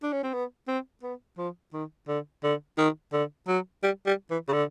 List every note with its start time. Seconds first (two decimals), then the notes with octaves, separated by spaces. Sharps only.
0.03 D4
0.13 C#4
0.23 C4
0.34 B3
0.68 C4
1.03 B3
1.38 F3
1.73 D#3
2.08 D3
2.43 D3
2.78 D#3
3.13 D3
3.48 F#3
3.83 G3
4.06 G3
4.30 E3
4.49 C#3
4.53 D3